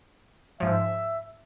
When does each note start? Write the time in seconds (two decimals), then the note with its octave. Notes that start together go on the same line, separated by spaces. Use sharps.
0.60 G#2 F3 E5